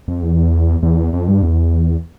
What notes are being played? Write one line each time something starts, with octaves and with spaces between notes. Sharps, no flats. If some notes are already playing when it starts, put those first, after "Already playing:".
F2
E2
E2
F2
G2
E2